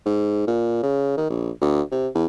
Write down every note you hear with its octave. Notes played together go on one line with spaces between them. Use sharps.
G#2
A#2
C#3
D#3
A#1
D2
C3
E2